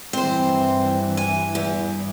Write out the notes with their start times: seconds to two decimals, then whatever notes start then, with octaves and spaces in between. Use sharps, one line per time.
0.13 G2 E3 C4 C5
1.17 G#5
1.55 E2